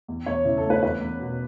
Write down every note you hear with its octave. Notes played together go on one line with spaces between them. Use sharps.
E2
E2 C#5
C#3 E4
A4
A3
B4
E2 B4
E2
B2